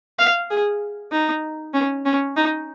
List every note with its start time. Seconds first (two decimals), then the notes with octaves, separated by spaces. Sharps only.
0.19 F5
0.50 G#4
1.12 D#4
1.74 C#4
2.06 C#4
2.37 D#4